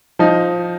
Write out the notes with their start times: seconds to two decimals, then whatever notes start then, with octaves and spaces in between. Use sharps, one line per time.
0.19 F3 D#4